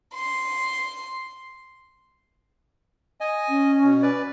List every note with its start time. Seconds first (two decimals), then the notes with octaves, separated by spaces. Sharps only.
0.14 C6
3.20 D#5 G#5
3.49 C#4
3.84 B2
4.02 B4 D5